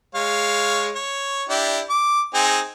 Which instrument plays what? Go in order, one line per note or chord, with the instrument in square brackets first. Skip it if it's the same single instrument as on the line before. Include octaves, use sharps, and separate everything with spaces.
[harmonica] G#3 C#5 F5
C#5
D4 E4 G4
D6
C4 D#4 G#4